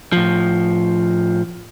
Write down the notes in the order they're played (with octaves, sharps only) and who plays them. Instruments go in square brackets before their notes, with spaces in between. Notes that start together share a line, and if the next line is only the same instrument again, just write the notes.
[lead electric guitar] A2 F3